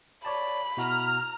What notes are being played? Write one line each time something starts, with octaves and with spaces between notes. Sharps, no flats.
C#5 D5 A5 B5
B2 E4 F#4 A#5 F6